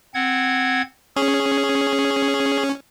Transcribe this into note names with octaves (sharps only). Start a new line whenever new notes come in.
C4 F#5 G#6
C#4 G#4